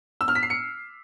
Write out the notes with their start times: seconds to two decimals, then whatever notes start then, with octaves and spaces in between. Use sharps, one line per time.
0.21 E6
0.28 F6
0.35 B6
0.43 C7
0.50 C#7